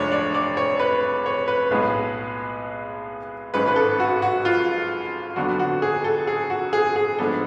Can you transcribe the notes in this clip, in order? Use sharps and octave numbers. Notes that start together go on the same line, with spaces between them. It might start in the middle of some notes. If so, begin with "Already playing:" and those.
Already playing: F1 F2 F3 G#3 D4 C#5
D5
D5
C#5
B4
C#5
B4
B1 A2 G#3 B3
G#1 G#2 G#3 C#4 B4
B4
A4
F#4
F#4
F4
F2 D3 F#3 B3 D4 F#4
F#4
G#4
A4
G#4
F#4
G#4
G#4
G#2 F3 B3 D4 A4